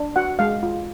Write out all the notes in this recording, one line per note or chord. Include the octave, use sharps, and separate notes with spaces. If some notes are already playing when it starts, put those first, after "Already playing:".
Already playing: D4
F#4 F#5
G#3 F5
F4